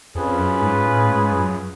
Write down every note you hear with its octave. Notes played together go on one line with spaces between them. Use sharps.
F2 C#4 F4 G#4 B4
F#2
G#2
A2
G#2
F#2